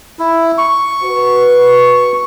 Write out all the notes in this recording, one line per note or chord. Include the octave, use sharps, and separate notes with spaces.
E4
C#6
F#4 B4